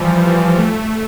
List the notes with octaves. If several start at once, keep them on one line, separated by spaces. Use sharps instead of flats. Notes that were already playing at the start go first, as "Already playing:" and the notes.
Already playing: E3 F3 G3
A3